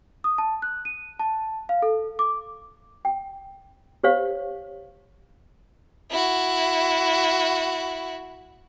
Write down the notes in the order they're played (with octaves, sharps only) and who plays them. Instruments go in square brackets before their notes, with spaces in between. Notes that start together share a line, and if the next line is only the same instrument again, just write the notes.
[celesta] D#6
A5
F#6
D#7
A5
F5
A4
D6
[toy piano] G5
G4 C5 C#5 F5
[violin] E4 F#4